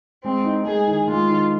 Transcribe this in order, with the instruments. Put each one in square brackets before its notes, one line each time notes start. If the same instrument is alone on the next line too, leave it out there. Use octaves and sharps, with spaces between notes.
[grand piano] G#3 [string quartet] C4
[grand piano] D#4
[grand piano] G#3 [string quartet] G#4
[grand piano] D#3
[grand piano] G#3 [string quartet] F4
[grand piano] D#3